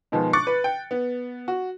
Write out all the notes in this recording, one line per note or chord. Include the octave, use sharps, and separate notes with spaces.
B2 D#3 F3 G#3 B3
C#6 D6 F#6 A6 C#7
B4
G5
B3
F#4